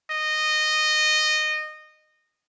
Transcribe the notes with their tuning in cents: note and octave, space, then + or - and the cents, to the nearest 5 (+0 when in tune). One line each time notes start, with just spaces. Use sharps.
D#5 -15